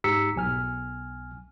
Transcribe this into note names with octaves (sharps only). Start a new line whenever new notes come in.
G#2 G4 A#5 E6 B6 C#7
B1 G#5 F6